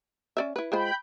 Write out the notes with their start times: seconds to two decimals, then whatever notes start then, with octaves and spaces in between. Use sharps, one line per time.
0.37 C#4 D5 E5
0.56 E4 B4
0.72 G#3 F4 C5 G5 B5 G6